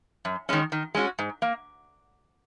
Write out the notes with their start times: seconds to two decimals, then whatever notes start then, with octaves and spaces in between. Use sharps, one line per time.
0.25 F#2
0.49 D#3 G#3 C#4
0.72 D#3
0.95 G#3 C#4 F#4
1.19 G#2
1.42 A#3